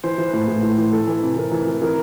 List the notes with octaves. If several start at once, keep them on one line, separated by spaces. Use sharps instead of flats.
E3 C5
E3
B4
A2
A2
A2
E3
E3 A4
E3
C3
E3 A#4
E3
E3
E3 A#4